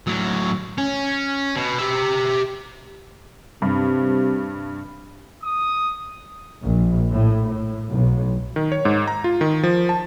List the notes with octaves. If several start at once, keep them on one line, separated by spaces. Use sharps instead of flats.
A2 F#3
C#4
B2
G4 E5
G2 C3
D#6
A#1
A2
A2
B1
D#3
C#5
G#2
A#5
F4
D#3
F3
A5